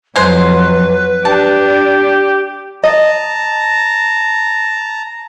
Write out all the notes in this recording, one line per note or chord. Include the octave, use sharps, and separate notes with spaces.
F2 F#3 G#3 B4 C5
D4 G4 A5
D#5 A5 A#5